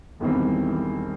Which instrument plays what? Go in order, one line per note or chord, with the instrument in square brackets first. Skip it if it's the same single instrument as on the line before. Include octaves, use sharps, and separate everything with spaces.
[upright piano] E1 E2 D#3 G3 C4 [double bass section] E3